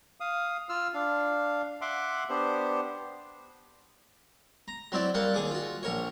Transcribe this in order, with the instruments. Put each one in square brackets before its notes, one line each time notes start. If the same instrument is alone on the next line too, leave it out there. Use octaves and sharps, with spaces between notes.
[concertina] F5 D#6
F4 E6 F6
D4 F5
E5 F#5 C6 D6
B3 D4 G4 C5
[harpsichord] A#5
F#3 C4 E4 D5
G3 A#3 F5 F#5
D#2 G#4 D6
F4 F#4
A#1 A#4 C#5